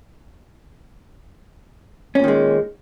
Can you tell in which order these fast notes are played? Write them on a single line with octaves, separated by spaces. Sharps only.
C#4 A#2 D#3 G#3